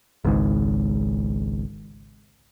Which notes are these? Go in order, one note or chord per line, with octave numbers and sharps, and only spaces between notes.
G#1 C#2 G#2